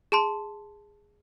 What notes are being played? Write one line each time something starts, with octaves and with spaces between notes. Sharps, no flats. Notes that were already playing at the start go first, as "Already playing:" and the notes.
G#4 A5 C6